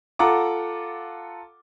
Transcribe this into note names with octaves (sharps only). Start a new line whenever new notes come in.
F4 A4 F#5 A#5 D6